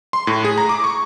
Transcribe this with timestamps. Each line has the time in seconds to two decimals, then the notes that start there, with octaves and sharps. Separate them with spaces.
0.13 C6
0.27 A2
0.44 G#4
0.58 A#5
0.69 D6
0.84 C#6